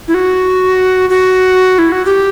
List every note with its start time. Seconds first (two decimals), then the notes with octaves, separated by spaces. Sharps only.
0.08 E4
0.14 F#4
1.10 F#4
1.79 E4
1.92 F#4
2.05 G4